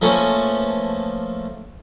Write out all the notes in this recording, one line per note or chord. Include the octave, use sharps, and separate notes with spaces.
F3 A3 A#3 C#4 B4 C#6